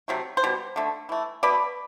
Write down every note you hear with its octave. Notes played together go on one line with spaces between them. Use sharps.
C3 F#3 A3
C5
B2 G3
D3 A3
E3 A3
B2 A3 B4 D5